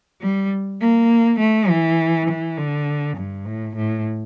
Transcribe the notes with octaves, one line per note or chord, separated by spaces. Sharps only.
G3
A#3
A3
E3
E3
D3
G2
A2
A2